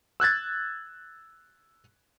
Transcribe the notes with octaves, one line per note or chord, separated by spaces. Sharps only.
E6 F#6 G#6 A6